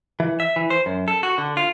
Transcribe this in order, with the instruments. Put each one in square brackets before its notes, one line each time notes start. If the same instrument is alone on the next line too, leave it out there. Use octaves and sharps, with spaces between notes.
[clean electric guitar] E3
E5
E3
C5
F#2
A4
F#4
D3
F4